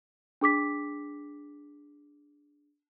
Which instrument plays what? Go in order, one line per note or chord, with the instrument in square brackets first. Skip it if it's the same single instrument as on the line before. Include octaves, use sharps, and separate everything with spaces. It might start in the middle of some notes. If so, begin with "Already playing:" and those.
[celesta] D4 G#4 D6 B6